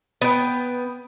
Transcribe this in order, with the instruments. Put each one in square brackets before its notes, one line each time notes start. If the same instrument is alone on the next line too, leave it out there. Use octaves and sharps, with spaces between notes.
[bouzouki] B3 G5